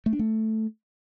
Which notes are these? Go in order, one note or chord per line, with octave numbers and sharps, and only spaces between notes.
A3
D4
A3